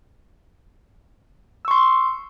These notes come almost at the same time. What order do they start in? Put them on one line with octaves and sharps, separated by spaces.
E6 C#6 C6